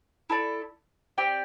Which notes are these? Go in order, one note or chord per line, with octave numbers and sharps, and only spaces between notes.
E4 A4 D5
C4 G4 D5 G5